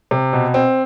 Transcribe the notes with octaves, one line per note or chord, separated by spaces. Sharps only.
C3
B2
C4